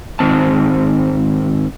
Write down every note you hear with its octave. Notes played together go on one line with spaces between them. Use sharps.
G#2 D#3 C4 A5